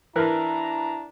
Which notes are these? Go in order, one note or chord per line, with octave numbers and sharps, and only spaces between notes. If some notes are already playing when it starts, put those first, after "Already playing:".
E3 D4 E4 A#4 B4 A#5